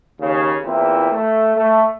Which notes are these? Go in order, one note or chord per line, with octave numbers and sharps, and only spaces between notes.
D#2 C#3
E2 A#2 C4 E4
A3
A3